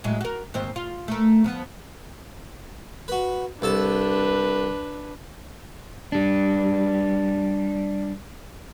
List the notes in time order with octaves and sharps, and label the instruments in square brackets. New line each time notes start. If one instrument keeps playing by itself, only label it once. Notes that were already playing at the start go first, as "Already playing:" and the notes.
[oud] A2 F#3 G#3
F#4 A#4
D#2 G#2 C4
F4
A3 A#4
F3 B3
[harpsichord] F#4 B4
[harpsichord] C2 A4 A5 [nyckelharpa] D4 B4
[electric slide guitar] G3 D4